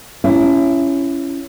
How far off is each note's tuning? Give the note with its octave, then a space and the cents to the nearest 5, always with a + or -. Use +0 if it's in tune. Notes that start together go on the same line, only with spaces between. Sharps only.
C#4 +0 E4 +25